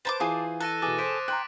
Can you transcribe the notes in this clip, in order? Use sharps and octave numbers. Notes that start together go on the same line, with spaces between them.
B4 C5 A5 B5 D6
E3 F4 G#4 C5
A4 F#6 A#6 D#7
B2 E3 G#4 D6 A6 D#7
C5 D#6 B6 D7
G5 A#5 C6 F#6